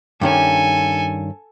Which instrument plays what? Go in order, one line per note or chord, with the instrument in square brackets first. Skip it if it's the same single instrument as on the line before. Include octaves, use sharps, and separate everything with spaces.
[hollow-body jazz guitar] G2 D#3 C#4 [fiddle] A4 G#5